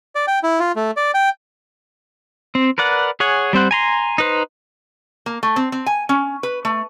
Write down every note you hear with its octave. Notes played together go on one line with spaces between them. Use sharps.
D5
G5
E4
F4
A3
D5
G5
C4
A#4 B4 D5 F#5
G#4 C#5 F#5 G#5
G3 C4 C5 F#5
G#5 A#5 C6
D#4 B4 C5
A#3
A3
C4
C4
G#5
C#4
B4
A3